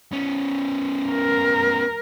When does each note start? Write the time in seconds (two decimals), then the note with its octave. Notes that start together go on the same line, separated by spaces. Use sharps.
0.12 B3 C#4
1.11 A#4